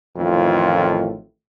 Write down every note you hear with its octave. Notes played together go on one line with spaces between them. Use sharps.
A1 F2 A2 D#3 F4